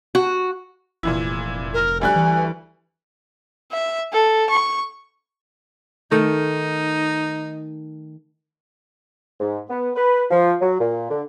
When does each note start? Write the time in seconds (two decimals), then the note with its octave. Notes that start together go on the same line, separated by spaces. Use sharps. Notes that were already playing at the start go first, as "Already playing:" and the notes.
0.15 F#4
1.03 F1 A#2 E3 E4
1.74 A#4
2.01 D2 G3 G#5 F#6
2.16 E3
3.72 E5
4.13 A4
4.50 C#6
6.11 D#3 A3 D#4
9.40 G#2
9.70 B3
9.96 B4
10.30 F3
10.61 F#3
10.80 A#2
11.10 D3